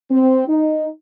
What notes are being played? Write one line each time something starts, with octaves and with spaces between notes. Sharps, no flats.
C4
D#4